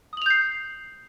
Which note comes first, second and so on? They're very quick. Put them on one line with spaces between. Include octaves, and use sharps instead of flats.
D#6 F#7 F7 G6 C7